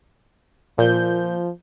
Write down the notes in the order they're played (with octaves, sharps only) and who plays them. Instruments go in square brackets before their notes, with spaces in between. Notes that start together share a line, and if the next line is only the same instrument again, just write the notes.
[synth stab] A#2 G6 [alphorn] F3